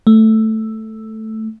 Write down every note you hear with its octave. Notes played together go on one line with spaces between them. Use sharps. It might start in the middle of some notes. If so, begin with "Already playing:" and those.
A3